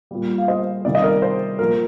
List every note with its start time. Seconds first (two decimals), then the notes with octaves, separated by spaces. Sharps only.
0.11 A#2 G3
0.38 F5
0.48 C5 D#5
0.85 C3 D#3 G3 D5
0.95 D#5
1.04 A#4 D5
1.22 C5
1.59 A#2 F3 A#4